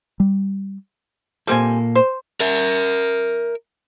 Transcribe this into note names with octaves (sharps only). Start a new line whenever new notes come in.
G3
A#2 G3 A#3 C4 A4 G#5
C5
A#4 E5